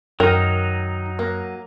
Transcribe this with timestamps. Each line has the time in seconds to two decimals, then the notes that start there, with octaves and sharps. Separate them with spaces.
0.20 F#2 D#3 F#3 D#4 A#4 D#5
1.19 A#3